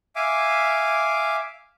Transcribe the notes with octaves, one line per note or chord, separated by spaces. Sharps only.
E5 F5 G#5 D6